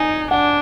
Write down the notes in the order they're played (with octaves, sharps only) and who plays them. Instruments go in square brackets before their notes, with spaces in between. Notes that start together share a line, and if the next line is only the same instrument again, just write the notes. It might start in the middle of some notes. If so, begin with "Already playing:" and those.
Already playing: [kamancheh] D#4 [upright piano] G#5
[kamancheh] D4 [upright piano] F#5